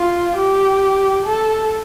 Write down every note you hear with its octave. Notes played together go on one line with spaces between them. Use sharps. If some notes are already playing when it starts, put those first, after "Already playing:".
Already playing: F4
G4
A4